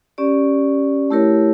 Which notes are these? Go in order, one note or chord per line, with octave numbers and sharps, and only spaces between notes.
C#4 G4 D5
A3 E4 G4 A#4 C#5